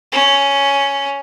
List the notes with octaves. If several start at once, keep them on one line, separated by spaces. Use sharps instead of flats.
C#4